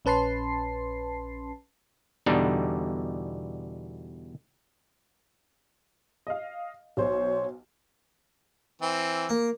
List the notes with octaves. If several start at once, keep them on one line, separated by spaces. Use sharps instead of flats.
A#1 C#4 B4 A5 C6 C7
E2 B2 D3 G3 D4 D#4
D#5 F5
B1 C5 C#5
E3 C4
A#3